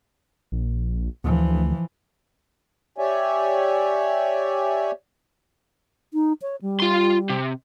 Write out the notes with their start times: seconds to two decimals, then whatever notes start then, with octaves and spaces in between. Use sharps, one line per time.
0.52 A#1
1.24 D2 E3 F3
2.98 G4 C#5 D5 E5 G#5
6.14 D#4
6.42 C#5
6.62 G3
6.80 F4 C6
7.30 C3